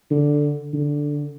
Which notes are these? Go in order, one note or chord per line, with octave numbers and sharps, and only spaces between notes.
D3
D3